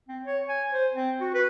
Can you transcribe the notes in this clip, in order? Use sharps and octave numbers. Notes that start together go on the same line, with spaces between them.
C4
C#5
G#5
C5
C4
F#4
B4